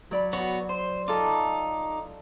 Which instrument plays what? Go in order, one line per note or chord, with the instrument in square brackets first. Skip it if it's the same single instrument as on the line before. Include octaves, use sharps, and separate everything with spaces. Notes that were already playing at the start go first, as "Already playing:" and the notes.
[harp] F#3 D5 B5
[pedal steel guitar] B3 F#4 C#5
[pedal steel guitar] C5 [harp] C6
[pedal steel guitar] D#4 D6 [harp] F4 A4